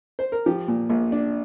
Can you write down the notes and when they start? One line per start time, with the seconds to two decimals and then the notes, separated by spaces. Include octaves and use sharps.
0.19 C5
0.32 A#4
0.46 F3 G4
0.68 A#2
0.90 A#1
1.12 D4